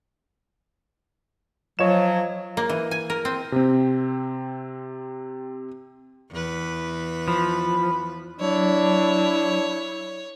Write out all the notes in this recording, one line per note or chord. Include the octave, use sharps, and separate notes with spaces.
F3 F#3 C#5 D#5 E7
A#3
E3
G#5
A#4
C4
C3 C4
E2 B4
F3 B5
F#3 D4 E4 C#5